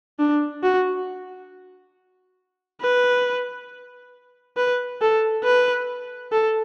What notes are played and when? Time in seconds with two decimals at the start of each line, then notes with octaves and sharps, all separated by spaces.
0.19 D4
0.63 F#4
2.81 B4
4.57 B4
5.01 A4
5.44 B4
6.32 A4